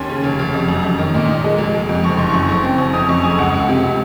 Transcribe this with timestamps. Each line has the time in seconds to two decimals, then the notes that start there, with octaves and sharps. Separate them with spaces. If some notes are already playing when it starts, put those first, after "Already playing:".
Already playing: D#2 C#4 C6
0.09 C#3
0.24 F1
0.39 F1
0.54 F2
0.68 F#2
0.83 F#2
0.99 D#3
1.14 A#2
1.28 D#4
1.44 G#3
1.58 F1
1.74 G#3
1.89 F2
2.04 F#1 C#6
2.17 F#1 C6
2.30 F#2 C#6
2.49 F#1
2.63 C4
2.78 F#2
2.93 F2 D#6
3.09 F2 C#6
3.24 C#3 G#5
3.38 C#2 F#5
3.54 C#2
3.69 C3